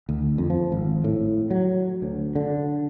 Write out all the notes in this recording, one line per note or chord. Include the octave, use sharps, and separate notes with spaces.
D2
F2
F3
G#1
A2
F#3
D2
D3